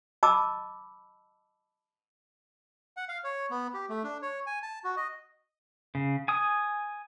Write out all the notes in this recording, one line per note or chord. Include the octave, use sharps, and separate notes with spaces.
D#5 A5 B5 D6 E6
F#5
F5
C#5
B3
G4
A3
D4
C#5
G#5
A5
F#4
D#5
C#3
G#5 D#6